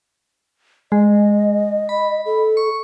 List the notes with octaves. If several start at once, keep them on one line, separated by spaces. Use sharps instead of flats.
G#3 D#5
B5
A4
C#6